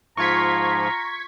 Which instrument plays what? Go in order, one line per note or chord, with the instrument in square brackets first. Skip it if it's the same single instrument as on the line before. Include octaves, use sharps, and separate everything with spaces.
[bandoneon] G#2 F3 [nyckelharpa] F4 [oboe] A#5 [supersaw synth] C#6 G#6 B6